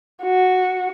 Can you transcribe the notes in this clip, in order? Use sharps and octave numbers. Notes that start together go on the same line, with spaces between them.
F#4